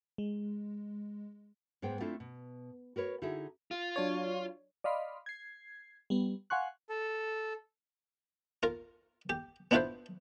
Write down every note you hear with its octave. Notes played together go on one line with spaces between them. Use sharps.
G#3
G#2 G#3 B3 C5 G5
A3 C4 D4 E4 F4 A4
B2
F#4 A#4 B4 C#5
D3 D#4 E4 F#4 G#4 E5
F4
F#3 D4 C#5
D5 D#5 F5 B5 C6
G#6 C7
G3 B3
F5 F#5 G#5 C6 C#6 F#6
A4
F4 A#4
G4
B3 D4 E4 F4 B4 C5